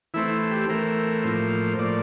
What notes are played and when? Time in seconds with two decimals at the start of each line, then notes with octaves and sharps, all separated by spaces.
0.14 E3 A3 C4 E4
0.51 G4
0.69 E3 A3 C4 A#4
1.24 A2 F3 A#3 C5
1.79 A2 F3 A#3 D5